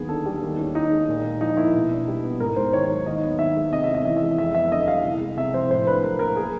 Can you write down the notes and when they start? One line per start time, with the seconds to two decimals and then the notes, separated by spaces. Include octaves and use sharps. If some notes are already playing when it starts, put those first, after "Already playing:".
Already playing: D#2 F#3 B3 G#4
0.09 D3 A4
0.26 G3
0.42 D#2
0.59 C#4
0.75 D#3 D#4
0.92 G#3
1.09 A#2
1.24 A#2
1.41 F3 D#4
1.57 A#3 E4
1.74 B2
1.91 D4
2.08 G3
2.24 B3
2.40 G#2 A#4
2.56 G#2 C5
2.73 D#3 C#5
2.90 F#3
3.06 D#2 D#5
3.23 B3
3.39 D#3 E5
3.56 G#3
3.72 C3 D#5
3.84 E5
3.89 C#4
3.95 D#5
4.05 E3 E5
4.17 E5
4.22 G#3
4.38 F2 E5
4.55 B3 E5
4.72 D3 D#5
4.88 G3 F5
5.04 C2
5.21 G#3
5.37 C3 E5
5.54 F3 C5
5.70 A2 C5
5.87 D4 B4
6.03 F#3 A#4
6.19 A#3 A#4
6.36 G#4